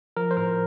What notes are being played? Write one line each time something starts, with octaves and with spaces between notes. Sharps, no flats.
F3 A#4
C5
A2 A#4